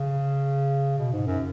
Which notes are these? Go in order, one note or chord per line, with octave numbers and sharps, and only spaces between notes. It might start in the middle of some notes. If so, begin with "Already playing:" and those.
Already playing: C#3
B2
G#2
F#2